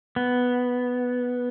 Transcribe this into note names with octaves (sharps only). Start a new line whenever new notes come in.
B3